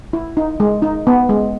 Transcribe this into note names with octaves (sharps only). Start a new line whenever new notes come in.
E4
D#4
G#3
D#4
B3
G#3